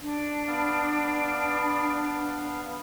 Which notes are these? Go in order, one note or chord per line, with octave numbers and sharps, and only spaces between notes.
D4
B3 F5